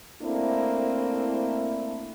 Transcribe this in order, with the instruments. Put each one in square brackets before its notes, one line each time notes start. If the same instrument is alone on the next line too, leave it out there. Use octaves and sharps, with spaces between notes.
[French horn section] A3 A#3 C4 D4 E4